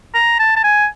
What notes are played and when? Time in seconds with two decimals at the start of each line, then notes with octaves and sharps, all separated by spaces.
0.14 A#5
0.39 A5
0.56 A5
0.64 G#5